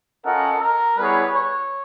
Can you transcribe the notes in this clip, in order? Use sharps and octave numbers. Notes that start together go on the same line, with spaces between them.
C#4 F4 A4 A#4 D#5 F#5
A#4
G3 B3 E4 G#4 B4 C#5
C#5